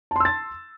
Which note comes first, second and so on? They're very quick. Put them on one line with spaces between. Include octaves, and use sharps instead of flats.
A5 C6 E6 A6